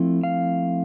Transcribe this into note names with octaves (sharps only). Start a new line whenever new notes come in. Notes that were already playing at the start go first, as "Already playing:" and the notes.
Already playing: F3 A3 C4 E4
F5